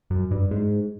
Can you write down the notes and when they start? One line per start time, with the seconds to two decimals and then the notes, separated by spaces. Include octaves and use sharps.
0.10 F#2
0.31 G2
0.51 G#2